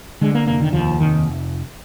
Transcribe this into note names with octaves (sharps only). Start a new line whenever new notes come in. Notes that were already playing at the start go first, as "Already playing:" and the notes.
D3 G#3
A#3
F1 A#3
D#3
D#2 F3
F1 D#3